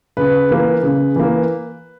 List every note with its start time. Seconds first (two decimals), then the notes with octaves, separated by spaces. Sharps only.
0.17 C#3 B4
0.51 E3 A#3
0.83 C#3
1.16 E3 A#3